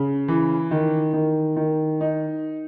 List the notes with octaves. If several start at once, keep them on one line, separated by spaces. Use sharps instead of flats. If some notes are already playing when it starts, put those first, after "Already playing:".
Already playing: C#3
E3
D#3
D#3
D#3
D#4